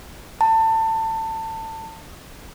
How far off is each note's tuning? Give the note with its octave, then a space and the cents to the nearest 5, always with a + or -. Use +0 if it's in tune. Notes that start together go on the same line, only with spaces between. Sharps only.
A5 +25